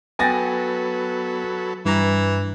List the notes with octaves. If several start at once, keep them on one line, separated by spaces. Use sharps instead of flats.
F#3 B3 A4 B4 G5 G#5 A6 A#6
G2 E3 A#5